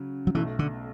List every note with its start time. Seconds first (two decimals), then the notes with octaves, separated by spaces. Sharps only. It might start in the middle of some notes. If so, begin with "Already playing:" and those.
Already playing: C#3 F#3
0.27 F#3
0.35 B1 B2 E3 A3
0.59 D3